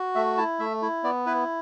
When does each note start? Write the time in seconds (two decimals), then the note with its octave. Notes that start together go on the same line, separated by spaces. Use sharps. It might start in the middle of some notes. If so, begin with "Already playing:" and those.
Already playing: F#4
0.15 A3 E5
0.37 E4 A5
0.59 A3 E5
0.82 E4
1.04 B3 D5
1.26 E4 B4